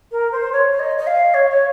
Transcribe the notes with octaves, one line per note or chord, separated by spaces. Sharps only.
A#4
C5
C#5
C#5
D#5
D#5
F5
C#5
C#5